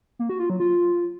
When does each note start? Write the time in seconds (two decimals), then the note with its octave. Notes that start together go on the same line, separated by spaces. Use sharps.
0.19 A#3
0.29 F#4
0.40 F4
0.50 F#3
0.60 F4